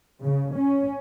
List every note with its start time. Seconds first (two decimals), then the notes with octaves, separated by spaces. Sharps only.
0.24 C#3
0.56 C#4